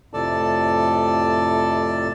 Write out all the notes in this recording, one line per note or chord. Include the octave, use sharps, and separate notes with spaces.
F2 A2 C3 A4 D5 A5